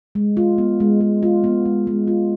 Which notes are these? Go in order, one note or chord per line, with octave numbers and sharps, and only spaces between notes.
G#3
F4
B3
G#3
G#3
F4
B3
G#3
G#3
F4